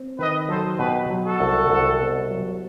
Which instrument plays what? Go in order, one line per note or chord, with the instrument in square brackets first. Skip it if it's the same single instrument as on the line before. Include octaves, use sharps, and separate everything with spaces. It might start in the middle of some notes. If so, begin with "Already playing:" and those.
Already playing: [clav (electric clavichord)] C4
[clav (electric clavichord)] D#3 [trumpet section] B4 D#5
[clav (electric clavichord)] F#3 [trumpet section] A4 C5
[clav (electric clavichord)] B2 [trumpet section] G4 B4
[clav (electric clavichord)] F#3
[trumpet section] F#4 A4
[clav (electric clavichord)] C2
C2
B2
F#3